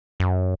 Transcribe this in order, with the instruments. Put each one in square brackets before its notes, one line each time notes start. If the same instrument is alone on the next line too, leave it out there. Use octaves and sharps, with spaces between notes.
[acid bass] F#2